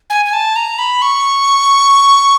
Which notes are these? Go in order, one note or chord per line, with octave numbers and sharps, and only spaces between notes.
G#5
G#5
A5
A#5
B5
C#6